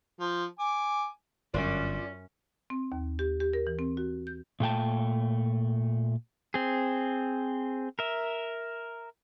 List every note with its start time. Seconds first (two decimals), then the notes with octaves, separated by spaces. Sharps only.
0.20 F3
0.59 G#5 D6
1.54 G1 F#2 C#4 D4 F4 D5
2.70 C4
2.92 D#2
3.19 G4
3.41 G4
3.53 A#4
3.67 E3
3.79 C4
3.97 F#4
4.27 G6
4.60 A#2 A3 G5 A5
6.54 C4 G#4
7.99 A#4 E5